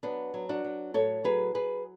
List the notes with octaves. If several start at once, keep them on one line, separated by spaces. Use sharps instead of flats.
F#3 B3 D4
F#3
D4 F#4
F#3
A2 A4 C#5
F#3 G#4 B4
F#3 G#4 B4